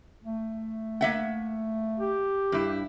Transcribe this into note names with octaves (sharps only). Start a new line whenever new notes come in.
A3
A#3 E5 F#5
G4
G2 E4